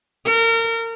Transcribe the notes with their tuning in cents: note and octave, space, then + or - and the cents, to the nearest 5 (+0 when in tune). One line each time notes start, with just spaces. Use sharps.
A#4 -30